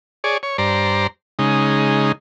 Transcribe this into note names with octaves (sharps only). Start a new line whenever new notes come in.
G#4 C#5 D5
C#5
G2 C5 D5 A#5
C#3 G#3 D#4